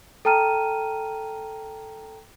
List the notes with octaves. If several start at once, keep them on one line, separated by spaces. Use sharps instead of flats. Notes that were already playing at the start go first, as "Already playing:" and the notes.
A4 G5 A5 A#5 F6 D#7